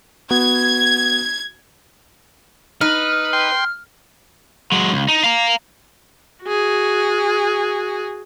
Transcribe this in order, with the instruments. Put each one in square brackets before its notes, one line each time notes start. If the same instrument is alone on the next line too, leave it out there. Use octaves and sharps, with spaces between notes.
[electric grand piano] B3 F#4 [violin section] G#6
[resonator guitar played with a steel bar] D#4 [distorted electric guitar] B4 [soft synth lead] F6
[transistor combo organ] G5 C6
[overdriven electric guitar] F#3 G#3
C#2
D#4
F5 A#5
[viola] F#4 G#4